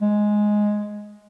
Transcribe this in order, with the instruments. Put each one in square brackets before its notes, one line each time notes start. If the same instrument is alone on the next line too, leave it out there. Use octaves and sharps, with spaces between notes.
[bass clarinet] G#3